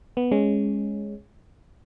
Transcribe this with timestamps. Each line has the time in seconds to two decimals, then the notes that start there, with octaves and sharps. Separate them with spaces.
0.17 B3
0.31 G#3 C#4